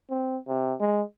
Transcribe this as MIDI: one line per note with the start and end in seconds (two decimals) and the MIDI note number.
0.10 0.38 60
0.48 0.74 48
0.80 1.02 56